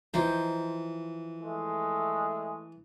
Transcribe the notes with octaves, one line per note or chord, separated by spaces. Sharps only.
E3 F3 D#4 C5
G#3 A3